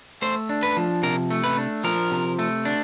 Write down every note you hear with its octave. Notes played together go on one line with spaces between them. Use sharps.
A3 C5
D4
B4
F3
C3 A#4
A3
B4
D4
F3 A#4
C3
A3
D4